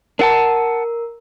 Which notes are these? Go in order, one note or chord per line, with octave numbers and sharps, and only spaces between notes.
D4 A#4 F#5 A5